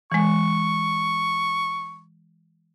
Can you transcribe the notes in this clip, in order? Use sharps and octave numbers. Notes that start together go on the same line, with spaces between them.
E3 G#3 C#6